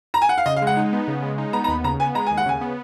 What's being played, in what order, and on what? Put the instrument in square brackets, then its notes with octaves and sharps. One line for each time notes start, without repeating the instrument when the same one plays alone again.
[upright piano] A#5
G#5
F#5
F5
[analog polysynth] C#3 [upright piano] D#5
[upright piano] F5
[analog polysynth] G#3 [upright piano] F#5
[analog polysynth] D#4
B3
C#3
G#3
D#4
[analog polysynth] B3 [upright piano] A#5
[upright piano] A#5
[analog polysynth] D#2 [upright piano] B5
[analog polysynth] C#3 [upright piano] A#5
[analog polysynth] B3 [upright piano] G#5
[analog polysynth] G#3 [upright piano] A#5
[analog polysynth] D#2 [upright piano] G#5
[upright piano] F#5
[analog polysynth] C#3 [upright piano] G#5
[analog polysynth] B3